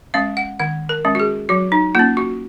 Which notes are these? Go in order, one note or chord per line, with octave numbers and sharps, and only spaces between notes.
G#3 C#4 F5
F#5
D#3 F#5
A#4
G#3 C#4
F#4
G#4
F#3 F#4
D#4
A#3 C#4 F4
F#4